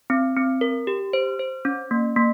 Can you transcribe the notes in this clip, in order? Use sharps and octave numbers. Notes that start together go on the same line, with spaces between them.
C4
C4
A#4
G4
C5
C5
C#4
A#3
A#3